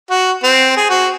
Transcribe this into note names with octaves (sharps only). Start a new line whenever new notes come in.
F#4
C4
G#4
F#4